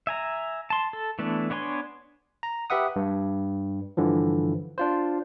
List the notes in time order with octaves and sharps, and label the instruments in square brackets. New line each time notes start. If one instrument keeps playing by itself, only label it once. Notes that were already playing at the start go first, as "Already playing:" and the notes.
[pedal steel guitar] E5 G#5 A#5
A5 C6
A4
E3 A3 B3 D4
B3 D4 C#5 G#5 C6
[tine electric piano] A#5
G4 B4 E5 F#5 D#6
G2
G2 D3 E3 F3
D4 F4 C5